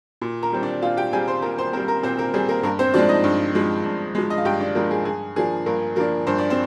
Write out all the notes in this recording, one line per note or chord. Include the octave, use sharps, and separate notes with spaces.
A#2
A#4 A#5
G3 C4
D4 D5
A#2 F4 F5
G4 G5
G3 C4 G#4 G#5
C5 C6
A#2 A#4 A#5
C5 C6
G3 C4 A#4 A#5
A#4 A#5
A#2 C4 C5
A#3 A#4
G3 C4 G#4
A#3 A#4
G2 A#3 A#4
C4 C5
F3 G#3 D4 D5
D#4 D#5
G2
F3 G#3
G2
F3 G#3
D#5
F5
G2 G4 G5
D4 D5
F3 G#3 A#3 A#4
G#4
G2 G#4
F3 A#3 D4 G#4
G2 A#3 A#4
F3 A#3 D4 A#4
G2 C5
D5
C4 C5